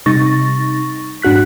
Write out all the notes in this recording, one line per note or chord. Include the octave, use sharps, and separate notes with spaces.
C3 G3 D#4 C#6 A6 A#6
G#2 D4 F#4 F#6 B6